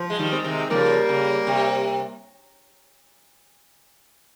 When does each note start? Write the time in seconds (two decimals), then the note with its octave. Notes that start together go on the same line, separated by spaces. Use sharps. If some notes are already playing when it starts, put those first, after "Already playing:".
Already playing: F3
0.10 G#3
0.19 D#3 G3
0.31 G#3 C4
0.44 C3 D#3
0.70 C#3 F3 G3 A#3
1.09 C#3
1.47 C3